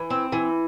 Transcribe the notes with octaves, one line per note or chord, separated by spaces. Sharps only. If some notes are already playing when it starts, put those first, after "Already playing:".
Already playing: E3
C4
E3